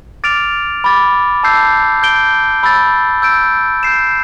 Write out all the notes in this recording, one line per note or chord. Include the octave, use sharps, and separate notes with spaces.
D6 F6 A6 D7 F7
B5 D6 A6
A5 E6 G6 C7
G6 D7 G7
B5 E6 A6
E6 G6 D7
G6 C7 E7